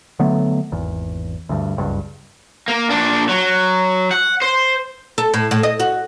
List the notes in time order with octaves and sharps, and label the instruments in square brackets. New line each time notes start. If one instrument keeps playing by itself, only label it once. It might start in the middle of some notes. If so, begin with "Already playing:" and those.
[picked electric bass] D3 F#3 A3 B3
G#1 E2
D2 G2
F#1 C#2 G2
[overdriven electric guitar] A#3
A#2 D4
F#3
F#5
C5
[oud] A4
A2
A2
D#5
F#4